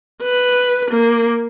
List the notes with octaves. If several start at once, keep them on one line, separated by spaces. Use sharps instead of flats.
B4
A#3